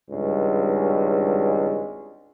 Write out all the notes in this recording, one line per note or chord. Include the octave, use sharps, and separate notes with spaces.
G#1 C#2 G2